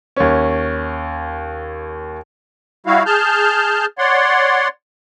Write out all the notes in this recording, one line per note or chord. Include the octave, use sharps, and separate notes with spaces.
D#2 C#4
G3 E4 F#4 F5
G#4 A5 F6 G6
C#5 D5 F#5 C6